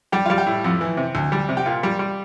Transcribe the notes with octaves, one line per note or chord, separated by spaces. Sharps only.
G3 G4
G3 F4
G4
A2
F2
E3
C3
D2
G3
C3
G4
A#2 F4
G3
G3